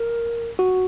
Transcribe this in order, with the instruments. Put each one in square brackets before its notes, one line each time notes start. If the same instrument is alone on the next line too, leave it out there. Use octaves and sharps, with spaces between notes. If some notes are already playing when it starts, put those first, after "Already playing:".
Already playing: [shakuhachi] A#4
[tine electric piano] F#4